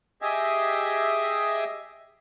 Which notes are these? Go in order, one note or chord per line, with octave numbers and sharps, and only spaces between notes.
G4 G#4 D#5 E5 G#5